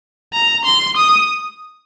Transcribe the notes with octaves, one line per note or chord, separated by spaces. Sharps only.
A#5
C6
D#6